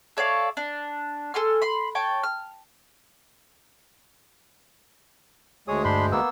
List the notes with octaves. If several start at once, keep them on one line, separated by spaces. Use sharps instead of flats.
A4 C#5 D5 F5
D4
A4 G#5 C6 F6
B5 C6
C#5 G5 A5
F6
D2 G#3 G#4 C#5 D#6
G2 D4 B5 C6
A#3 B3 E6